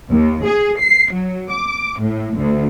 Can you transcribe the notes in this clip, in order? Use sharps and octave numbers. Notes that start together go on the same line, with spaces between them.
D#2
G#4
C7
F#3
D6
A2
D2